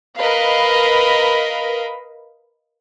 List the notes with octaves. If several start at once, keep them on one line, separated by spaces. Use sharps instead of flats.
A#4 B4 D#5 F5 B5